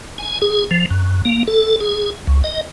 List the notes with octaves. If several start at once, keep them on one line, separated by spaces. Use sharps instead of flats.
G#5
G#4
F3
F#2
A#3
A4
G#4
C#2
D#5